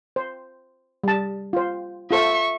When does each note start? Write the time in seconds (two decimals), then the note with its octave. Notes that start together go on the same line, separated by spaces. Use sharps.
0.16 C5
1.04 G3 A5
1.53 F4 C5
2.11 F4 A4 C5 E5 C#6